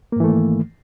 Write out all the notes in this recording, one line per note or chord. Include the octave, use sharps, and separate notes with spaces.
G#2 D#3 E3 A3 A#3